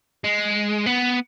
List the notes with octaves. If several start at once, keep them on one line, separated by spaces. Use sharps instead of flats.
G#3
B3